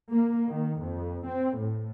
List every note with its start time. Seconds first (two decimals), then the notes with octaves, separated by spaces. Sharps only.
0.11 A#3
0.48 D#3
0.81 F2
1.26 C4
1.57 A2